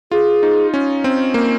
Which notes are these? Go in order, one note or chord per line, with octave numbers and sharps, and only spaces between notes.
F4 G#4
D#4
C#4
C4
A#3